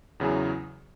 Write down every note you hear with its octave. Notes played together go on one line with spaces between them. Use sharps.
E2 C#3 F#3 E4 G#4